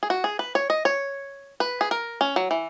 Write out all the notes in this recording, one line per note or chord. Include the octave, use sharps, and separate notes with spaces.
G#4
F#4
G#4
B4
C#5
D#5
C#5
B4
G#4
A#4
C#4
F#3
E3